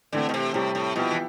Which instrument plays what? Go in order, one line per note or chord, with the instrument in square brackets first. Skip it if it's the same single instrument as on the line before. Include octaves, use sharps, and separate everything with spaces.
[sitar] D3 [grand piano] E3 A3 C4
[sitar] B2
C3
[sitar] A2 [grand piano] C3 G3 C4
[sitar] A2
[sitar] B2 [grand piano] F3 B3 E4 G4
[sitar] E3